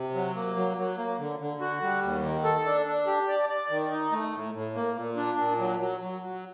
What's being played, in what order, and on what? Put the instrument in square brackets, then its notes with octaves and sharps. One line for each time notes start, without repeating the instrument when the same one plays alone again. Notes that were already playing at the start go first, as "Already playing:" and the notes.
Already playing: [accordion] C3
F#3
A#3
F#3
F#3
A#3
D3
D3
F#4
G3
D#2
D#3
A4
D4
D4
G4
D5
D5
D#3
D#4
A3
A2
A2
A#3
A#2
D4
A#2
F#3
F#3
F#3
F#3